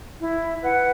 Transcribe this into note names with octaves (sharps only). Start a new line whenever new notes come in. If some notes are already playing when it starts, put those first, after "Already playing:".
E4
B4 F#5